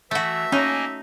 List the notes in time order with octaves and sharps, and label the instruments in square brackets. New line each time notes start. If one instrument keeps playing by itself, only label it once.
[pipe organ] E3 [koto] A3 F#4 [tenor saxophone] E5
[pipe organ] A#3 D#5 G#5 [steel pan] C#4 [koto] D#4